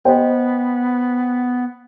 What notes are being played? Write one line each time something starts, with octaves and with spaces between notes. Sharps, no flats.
B3 C5 D#5 G5